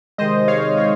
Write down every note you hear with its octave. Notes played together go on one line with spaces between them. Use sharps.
C3 D#3 G#3 C5 D#5
C#5 F5
C#5 F5